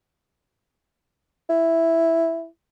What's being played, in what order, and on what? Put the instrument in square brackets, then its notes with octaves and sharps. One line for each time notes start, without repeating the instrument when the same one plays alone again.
[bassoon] E4